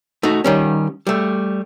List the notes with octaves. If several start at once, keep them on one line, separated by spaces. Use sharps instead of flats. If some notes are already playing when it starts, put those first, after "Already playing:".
A3 D#4 F#4
D#3 G3 C#4
G3 A3